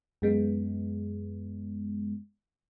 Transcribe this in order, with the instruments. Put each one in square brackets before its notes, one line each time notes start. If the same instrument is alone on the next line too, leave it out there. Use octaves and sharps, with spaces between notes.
[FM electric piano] F#2 G#3 B3